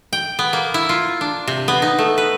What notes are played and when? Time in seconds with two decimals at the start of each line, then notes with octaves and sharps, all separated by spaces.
0.13 G5
0.39 B3
0.53 A#3
0.74 E4
0.89 F4
1.21 D4
1.47 C3
1.68 B3
1.82 D#4
1.99 A3
2.18 B4